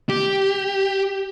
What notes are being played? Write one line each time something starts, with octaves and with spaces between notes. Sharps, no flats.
G4